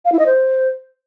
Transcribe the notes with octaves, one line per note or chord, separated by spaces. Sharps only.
F5
E4
D#5
C5